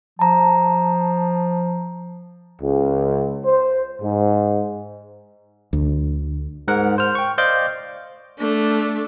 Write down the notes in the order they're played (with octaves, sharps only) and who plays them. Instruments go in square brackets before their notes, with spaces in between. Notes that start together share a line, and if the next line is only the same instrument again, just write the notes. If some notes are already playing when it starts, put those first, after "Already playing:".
[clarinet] F3 [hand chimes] A5 A#5
[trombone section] C#2
C5
G#2
[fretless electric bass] D2
[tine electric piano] G#2 A#4 F#5
C5 F6
G5 C#6
C5 D5 D#5 F5 D6 G6
[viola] A3 D4